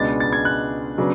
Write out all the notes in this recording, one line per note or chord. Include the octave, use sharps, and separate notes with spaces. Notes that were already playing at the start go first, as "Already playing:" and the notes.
Already playing: C#2 B2 G#3 B3 D4 A6
A6
G#6
F#6
C#3 F#3 B3 D4